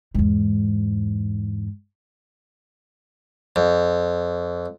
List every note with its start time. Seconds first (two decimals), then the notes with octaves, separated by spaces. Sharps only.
0.14 E2 G#2
3.56 F2